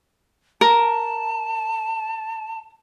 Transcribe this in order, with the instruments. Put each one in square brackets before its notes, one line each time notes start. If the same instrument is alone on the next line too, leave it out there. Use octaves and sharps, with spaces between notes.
[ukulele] A#4 [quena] A5